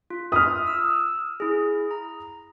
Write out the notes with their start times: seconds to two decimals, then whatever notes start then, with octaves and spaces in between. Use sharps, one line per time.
0.10 F4
0.32 F4 E5 B5 D#6 F6
0.67 E6
1.40 E4 G#4
1.91 A#5